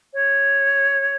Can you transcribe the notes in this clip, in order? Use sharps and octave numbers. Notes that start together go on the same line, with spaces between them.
C#5